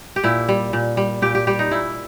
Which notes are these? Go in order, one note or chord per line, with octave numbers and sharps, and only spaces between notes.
G4
A#2 E4
G3
A#2
G3
A#2 G4
G4
G3 G4
D#4
A#2 E4